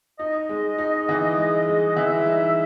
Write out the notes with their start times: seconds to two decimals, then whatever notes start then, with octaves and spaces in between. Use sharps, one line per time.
0.19 D#4 D#5
0.49 G#3
0.78 D#4
1.09 E3
1.37 G#3
1.67 G#3
1.96 E3 E5
2.26 D#4